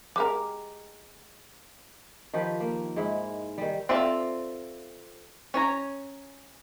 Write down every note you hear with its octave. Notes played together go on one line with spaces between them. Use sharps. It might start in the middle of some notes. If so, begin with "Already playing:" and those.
G#3 G4 A#4 D6
D#3 F3 G4 B4
A#3
G#2 G#3 E4
D#3 G3
C4 F4 A4 D5 E5
C#4 C#5 A#5